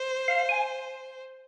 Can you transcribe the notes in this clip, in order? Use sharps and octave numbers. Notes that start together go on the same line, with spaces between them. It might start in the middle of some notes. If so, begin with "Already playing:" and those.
Already playing: C5
F5
G#5